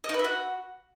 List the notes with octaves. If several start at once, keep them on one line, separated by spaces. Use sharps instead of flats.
D#5
D#4
B4
E5
F#4